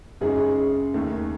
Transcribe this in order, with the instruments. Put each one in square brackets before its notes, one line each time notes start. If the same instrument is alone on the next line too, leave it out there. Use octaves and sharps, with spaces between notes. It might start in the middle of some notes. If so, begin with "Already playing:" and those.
[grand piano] F#2 C#3 G#3 D#4 G#4
D#2 D#3 A3